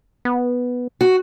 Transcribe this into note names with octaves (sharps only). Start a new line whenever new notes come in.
B3
F#4